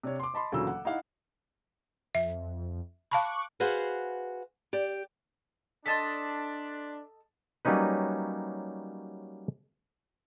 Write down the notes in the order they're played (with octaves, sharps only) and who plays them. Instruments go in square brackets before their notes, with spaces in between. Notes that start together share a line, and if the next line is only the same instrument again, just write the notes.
[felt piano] C3 D4 C#5
C6 D6
D#5 A5 B5 C6
D2 A#2 C#3 E3 F#3 E6
F#5
D#4 E4 F5 F#5
[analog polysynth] F2 [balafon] E5
[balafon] F5 A5 B5 [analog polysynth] C#6 D6 F#6
[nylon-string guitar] F#4 G#4 B4 C5 F5 F#5
G4 D5
[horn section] D4 [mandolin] A4 D#5 A5 [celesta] C6 A6 B6
[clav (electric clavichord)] F#3 G3 A#3 C#4 D#4 B4